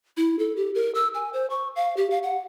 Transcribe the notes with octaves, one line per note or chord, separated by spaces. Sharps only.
E4
A4
G4
A#4
E6
G#5
C5
C#6
F5
G4
F5
F#5